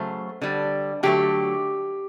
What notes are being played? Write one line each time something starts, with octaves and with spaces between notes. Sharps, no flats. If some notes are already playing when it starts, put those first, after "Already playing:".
Already playing: C#3 F#3 A3 C5
D3 G3
D3 F#3 A3 G4